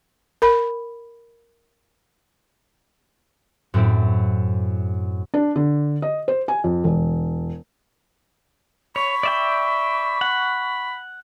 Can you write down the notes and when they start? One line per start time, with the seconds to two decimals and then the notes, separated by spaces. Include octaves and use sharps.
0.42 A#4 B5
3.74 F#2 A2 C4 E4
5.34 D4
5.56 D3
6.02 D#5
6.28 C5
6.48 G#5
6.64 F2
6.84 E1
8.96 C#5 B5 C#6
9.23 D5 E5 G5
10.21 F#5